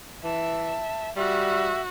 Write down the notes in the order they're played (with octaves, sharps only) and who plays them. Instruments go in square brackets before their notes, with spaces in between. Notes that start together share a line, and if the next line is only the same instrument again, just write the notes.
[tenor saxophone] E3 [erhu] E5 [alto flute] A5
[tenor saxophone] G3 [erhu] F#4 [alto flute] E5